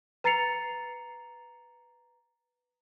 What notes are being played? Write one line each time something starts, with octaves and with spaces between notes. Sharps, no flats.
B4 A#5 A6 C7 C#7 F7